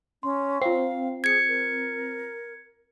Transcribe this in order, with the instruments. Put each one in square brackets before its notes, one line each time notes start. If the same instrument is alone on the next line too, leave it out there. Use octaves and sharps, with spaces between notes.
[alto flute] C#4 [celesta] C6
[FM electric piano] C4 [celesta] F4 C7 [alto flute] F5
[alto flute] G#4 [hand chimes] G#6 C#7
[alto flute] A#4